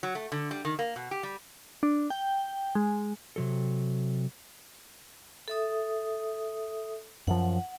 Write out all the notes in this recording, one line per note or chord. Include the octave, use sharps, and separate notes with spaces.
F#3
A3
D3
G3
D#3
A#3
B2
G4
G3
D4
G5
G#3
C3 F#3 A4
A4 E5 D#6
F#2 F3 F#5